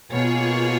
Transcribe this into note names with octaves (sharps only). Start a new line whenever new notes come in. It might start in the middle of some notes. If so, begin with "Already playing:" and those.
B2 A#3 F4 G#4 C#5